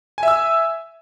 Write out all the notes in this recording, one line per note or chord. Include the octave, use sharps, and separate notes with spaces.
E5 G#5 E6